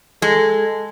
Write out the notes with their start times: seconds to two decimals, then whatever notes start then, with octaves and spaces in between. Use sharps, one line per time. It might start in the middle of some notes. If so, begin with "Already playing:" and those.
0.22 G#3 A4